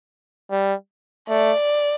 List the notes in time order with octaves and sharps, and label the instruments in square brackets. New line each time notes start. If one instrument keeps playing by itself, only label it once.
[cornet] G3
[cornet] A3 [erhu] D5